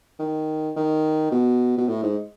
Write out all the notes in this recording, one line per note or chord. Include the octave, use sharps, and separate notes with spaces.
D#3
D#3
B2
B2
A2
G#2